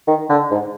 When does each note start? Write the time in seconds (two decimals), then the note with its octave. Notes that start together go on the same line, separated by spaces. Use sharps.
0.08 D#3
0.30 D3
0.51 G#2